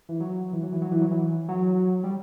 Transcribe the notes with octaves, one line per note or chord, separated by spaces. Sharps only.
E3
F#3
E3
F#3
E3
F#3
E3
F#3
E3
F#3
G3